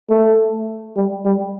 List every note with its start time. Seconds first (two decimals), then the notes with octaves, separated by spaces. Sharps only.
0.10 A3
0.96 G3
1.25 G3